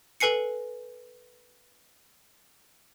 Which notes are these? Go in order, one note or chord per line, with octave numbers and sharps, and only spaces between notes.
A4 B4 G#5 C7 C#7